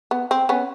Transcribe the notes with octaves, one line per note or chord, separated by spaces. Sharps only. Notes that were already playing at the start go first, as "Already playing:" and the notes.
B3
C4
B3 C#4